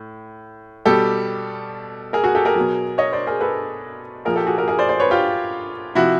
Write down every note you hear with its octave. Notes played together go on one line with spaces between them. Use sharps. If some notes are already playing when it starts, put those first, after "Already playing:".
Already playing: A2
B2 G3 G4 A4
G#4 A#4
F#4 G#4
G4 A4
G#4 A#4
B2 F#3
C#5 D#5
C5 D5
G#4 A#4
A4 B4
A#2 F3 G#4 A#4
G4 A4
F#4 G#4
G#4 A#4
G#4 A#4
C5 D5
C5 D5
B4 C#5
F4 G4
C3 F3 E4 F#4